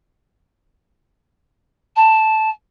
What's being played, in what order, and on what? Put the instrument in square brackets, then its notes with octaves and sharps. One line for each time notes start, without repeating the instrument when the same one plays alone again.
[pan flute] A5